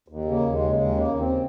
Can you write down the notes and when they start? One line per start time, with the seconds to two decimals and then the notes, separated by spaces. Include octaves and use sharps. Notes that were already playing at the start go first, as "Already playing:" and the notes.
0.08 D#2
0.25 C#3
0.31 A#3
0.41 D#2
0.53 G#3
0.59 C#3
0.75 D#2 G#3
0.91 C#3
0.97 A#3
1.08 D#2
1.19 C4
1.25 C#3